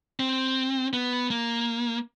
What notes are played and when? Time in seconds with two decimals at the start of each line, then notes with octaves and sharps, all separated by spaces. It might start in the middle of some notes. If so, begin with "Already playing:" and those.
0.19 C4
0.93 B3
1.30 A#3